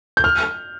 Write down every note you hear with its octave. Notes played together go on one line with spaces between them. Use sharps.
G6
F6